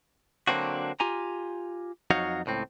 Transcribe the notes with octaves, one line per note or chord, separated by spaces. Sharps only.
D3 F#3 A#3 C4 D4 F#4
F4 G4 G#5 A#5
F2 F#3 D#4 F#4 C#5 F5
C#2 A2 C4